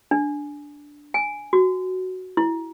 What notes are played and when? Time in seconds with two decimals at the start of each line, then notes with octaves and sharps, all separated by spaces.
0.11 D4
1.14 G#5
1.53 F#4
2.37 E4